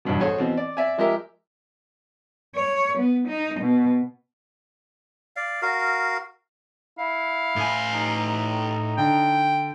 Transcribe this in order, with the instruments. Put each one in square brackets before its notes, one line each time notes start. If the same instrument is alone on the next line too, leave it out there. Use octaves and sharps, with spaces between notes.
[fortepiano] B1 E2 G2 B2
F#4 G#4 A4 C5 C#5 G#5
B2 E3 C4
D5
D5 E5 G#5
F3 G#3 G4 A#4 E5
[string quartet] C#5
B3
D#4
B2
[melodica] D5 F5
F#4 A#4 F5
[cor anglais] E4 [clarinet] F5
[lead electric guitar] A2 G#5
[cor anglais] D#4
[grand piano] D3 [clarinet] G5